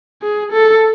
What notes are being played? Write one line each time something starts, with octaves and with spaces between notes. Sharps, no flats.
G#4
A4